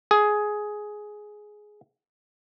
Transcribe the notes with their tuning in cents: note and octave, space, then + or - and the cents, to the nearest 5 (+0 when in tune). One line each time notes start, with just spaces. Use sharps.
G#4 +10